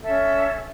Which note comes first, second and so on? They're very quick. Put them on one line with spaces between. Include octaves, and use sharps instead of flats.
A4 E5 C#4